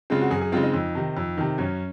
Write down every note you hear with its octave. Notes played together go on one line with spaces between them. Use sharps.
C#3 G#3 C4 F4
F#4
F#2 G#4
G#4
C#3 G#3 C4 F4
D#4
F2
C3 D#3
F2
C3 D#3
F#2 C#4